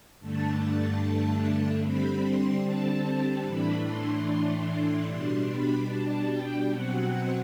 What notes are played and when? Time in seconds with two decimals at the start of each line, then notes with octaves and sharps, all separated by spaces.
0.20 G2 D3 A3 D4 A5
1.82 D3 G3 C4 B5
2.23 C6
2.64 A5
3.45 A2 E3 A3 D4 B5
3.85 C6
4.26 C6
5.07 B2 G3 D4 C6
5.48 B5
5.89 A5
6.29 G5
6.70 B2 F#3 C4 F#5